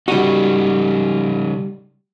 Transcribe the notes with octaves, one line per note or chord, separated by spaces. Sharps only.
C#3 G3 D#4 F#4